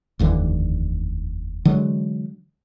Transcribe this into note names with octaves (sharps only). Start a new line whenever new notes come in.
F1 D#2 D3 E3
D3 E3 F#3 G#3